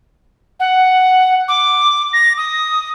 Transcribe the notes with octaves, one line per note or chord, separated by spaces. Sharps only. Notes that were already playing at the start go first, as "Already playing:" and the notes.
F#5
D6
A#6
D#6